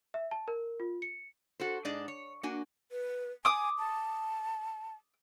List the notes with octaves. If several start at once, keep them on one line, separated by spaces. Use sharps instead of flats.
E5
A5
A#4
F4
C#7
F#4 A4 C5
G#2 D4 G#4 D5 D#5
C#5
A#3 D4 F#4 G#5
B4
G#5 D6 D#6
A5